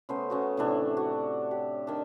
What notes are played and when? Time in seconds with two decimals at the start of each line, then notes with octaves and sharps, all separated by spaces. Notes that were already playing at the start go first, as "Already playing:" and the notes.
0.09 C#3 A3 B3 C5
0.30 C#3 B3 F#4
0.57 A2 C3 E3 D4
0.97 F#4
1.51 G4
1.87 D#3 D4